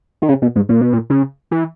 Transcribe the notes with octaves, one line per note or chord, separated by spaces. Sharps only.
D#3
C#3
B2
G#2
A#2
B2
A#2
C#3
E3